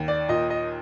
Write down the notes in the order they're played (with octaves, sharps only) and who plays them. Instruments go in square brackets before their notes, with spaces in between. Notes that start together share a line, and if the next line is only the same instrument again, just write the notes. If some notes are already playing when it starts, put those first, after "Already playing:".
Already playing: [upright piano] D#2
[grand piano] D5
[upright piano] A#2 [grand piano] D#5
[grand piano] D#5